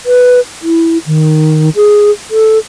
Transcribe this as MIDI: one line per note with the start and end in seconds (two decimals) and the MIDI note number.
0.06 0.40 71
0.62 0.98 64
1.06 1.69 51
1.76 2.10 68
2.31 2.58 69